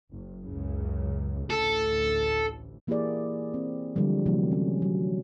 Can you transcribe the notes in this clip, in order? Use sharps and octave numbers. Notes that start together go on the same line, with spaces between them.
F#1
C#2 F#2 C#3
A1 D2 A4
E3 A#3 E4 G4 G#4 D5
C4
D3 E3 F3 G3 G#3
C3 E3 F#3 A3
C#4
F#3